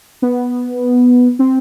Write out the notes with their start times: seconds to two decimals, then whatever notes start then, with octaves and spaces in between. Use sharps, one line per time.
0.22 B3
1.39 C4